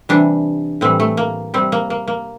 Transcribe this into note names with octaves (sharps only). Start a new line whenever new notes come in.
C3 E3 G3 D4
A2 E3 G3 C4
A3
A#3
C3 G3 C4
A#3
A#3
A#3